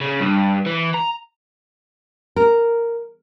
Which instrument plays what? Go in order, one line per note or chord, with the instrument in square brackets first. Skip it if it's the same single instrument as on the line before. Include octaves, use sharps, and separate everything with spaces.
[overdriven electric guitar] C#3
G2
E3
A#5
[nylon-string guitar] A#4